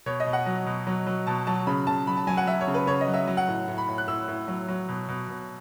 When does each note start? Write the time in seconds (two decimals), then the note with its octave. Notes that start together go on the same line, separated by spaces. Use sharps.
0.06 B2 C#5
0.20 D#5
0.26 B2
0.33 F#5
0.46 F#3
0.66 B2
0.87 F#3
1.07 F#3
1.27 B2 A5
1.47 F#3 A5
1.67 C#3 B5
1.87 C#3 A5
2.07 F#3 B5
2.17 A5
2.27 F#3 G#5
2.37 F#5
2.47 F#3 E5
2.61 C#5
2.67 C#3
2.74 B4
2.87 C#3 C#5
3.01 D#5
3.08 F#3
3.14 E5
3.27 F#3
3.37 F#5
3.48 A2
3.68 A2
3.78 B5
3.88 A2
3.98 F#6
4.07 A2 E6
4.28 A2
4.48 F#3
4.68 F#3
4.88 B2
5.08 B2
5.28 B2